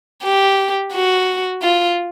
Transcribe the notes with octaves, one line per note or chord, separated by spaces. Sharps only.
G4
F#4
F4